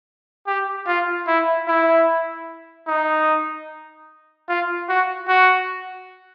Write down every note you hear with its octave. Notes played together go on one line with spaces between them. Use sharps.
G4
F4
E4
E4
D#4
F4
F#4
F#4